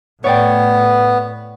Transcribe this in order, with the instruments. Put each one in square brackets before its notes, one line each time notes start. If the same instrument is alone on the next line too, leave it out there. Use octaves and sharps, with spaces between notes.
[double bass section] A2 [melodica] B3 [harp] C#5 D5 G5